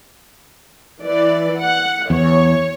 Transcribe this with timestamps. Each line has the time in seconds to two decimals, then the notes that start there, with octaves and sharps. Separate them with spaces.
1.02 E3 D5
1.61 F#5
2.10 E2 C#5